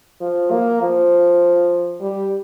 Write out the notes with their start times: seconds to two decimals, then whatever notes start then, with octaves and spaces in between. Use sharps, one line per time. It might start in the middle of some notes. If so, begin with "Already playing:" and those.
0.21 F3
0.51 A#3
0.82 F3
2.01 G3